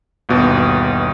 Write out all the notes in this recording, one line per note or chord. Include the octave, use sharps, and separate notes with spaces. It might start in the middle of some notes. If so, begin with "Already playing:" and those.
G1 D#2 B2